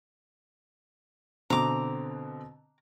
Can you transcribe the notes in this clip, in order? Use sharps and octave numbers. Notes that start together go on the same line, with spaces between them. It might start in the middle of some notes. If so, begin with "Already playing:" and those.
B2 D3 C4 A#5 D6